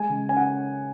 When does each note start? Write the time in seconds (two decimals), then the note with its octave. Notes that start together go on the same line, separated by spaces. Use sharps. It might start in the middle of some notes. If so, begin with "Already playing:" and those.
Already playing: G#3 G#5
0.09 C#3
0.29 C#4 G#5
0.37 F#5